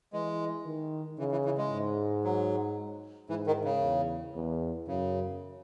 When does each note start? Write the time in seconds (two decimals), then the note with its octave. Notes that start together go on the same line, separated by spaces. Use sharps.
0.13 E3 G#3
0.66 D#3
1.19 C#3 E3
1.32 E3
1.45 E3
1.58 G#3
1.71 G#2
2.24 F#3
3.29 G#2 E3
3.47 D#3
3.65 C#3
3.82 E2
4.35 E2
4.88 F#2 C#3